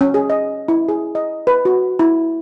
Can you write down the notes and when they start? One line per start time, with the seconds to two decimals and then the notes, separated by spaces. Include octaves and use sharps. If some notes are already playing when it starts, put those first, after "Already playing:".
0.01 C#4
0.14 G#4
0.30 D#5
0.68 E4
0.89 G#4
1.15 D#5
1.47 B4
1.65 F#4
1.99 E4